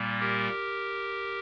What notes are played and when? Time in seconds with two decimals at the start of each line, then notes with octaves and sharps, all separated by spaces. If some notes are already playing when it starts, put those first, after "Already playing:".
Already playing: A#2 G3 A#3
0.20 G4 A#4